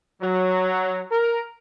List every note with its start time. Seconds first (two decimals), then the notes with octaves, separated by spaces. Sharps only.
0.21 F#3
1.11 A#4